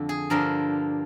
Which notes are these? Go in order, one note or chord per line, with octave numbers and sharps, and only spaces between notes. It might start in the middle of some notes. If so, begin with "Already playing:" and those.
Already playing: F2 D3
G#4
G2 D3 F3 A#4